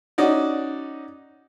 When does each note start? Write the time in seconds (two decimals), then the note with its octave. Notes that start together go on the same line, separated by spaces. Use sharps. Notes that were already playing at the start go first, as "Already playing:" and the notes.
0.18 C#4 D#4 F#4 D5